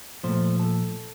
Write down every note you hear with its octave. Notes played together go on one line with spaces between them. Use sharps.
A#2 F3 A3 C5
A4